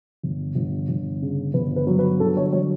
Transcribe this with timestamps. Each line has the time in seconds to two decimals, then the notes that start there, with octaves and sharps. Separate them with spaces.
0.23 G1
0.55 G1
0.89 G1
1.22 C#3
1.54 G1 B4
1.76 B4
1.87 F#3
1.99 B4
2.20 D3 A4
2.37 C#5
2.53 F#3 C#5